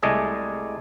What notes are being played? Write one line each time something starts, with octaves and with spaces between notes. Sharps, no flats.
C2 G#3 A3 D5 D#5 G#5